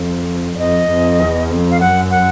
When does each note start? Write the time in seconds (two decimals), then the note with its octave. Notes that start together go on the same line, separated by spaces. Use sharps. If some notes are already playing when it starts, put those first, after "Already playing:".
Already playing: F2
0.55 D5
0.58 F2 D#5
0.90 F2
1.20 E2
1.50 F2
1.71 F5
1.80 F#2 F#5
2.11 F#5